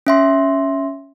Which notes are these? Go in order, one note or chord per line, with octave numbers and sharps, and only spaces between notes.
C#4 E5 C6